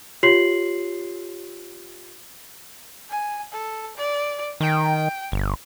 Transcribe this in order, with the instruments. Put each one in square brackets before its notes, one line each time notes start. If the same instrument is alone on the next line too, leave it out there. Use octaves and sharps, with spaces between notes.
[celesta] F4 G4 C#5 C6 C7 F#7
[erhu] G#5
A4
D5
[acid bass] D#3 [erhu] G5
[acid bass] G1